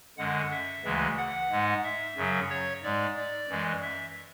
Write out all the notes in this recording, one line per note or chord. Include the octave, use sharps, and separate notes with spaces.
F#2 D3 G#3 F#5
E5
D2 C#3 E3 G#3
F#5
G#2 G#3
E5
F#2 C#3 F#3
C#5
G#2 G#3 D5
D5
F#2 E3 G#3
E5